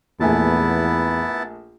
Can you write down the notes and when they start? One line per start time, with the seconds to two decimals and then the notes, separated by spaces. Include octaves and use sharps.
0.20 A#1 E2 A3 B3 E4 G#5 A5